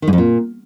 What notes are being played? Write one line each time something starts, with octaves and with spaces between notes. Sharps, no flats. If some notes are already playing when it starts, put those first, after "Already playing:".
D#3
G#2
F2
A#2